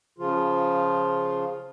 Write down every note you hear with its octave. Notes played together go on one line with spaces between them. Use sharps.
C#3 F3 F4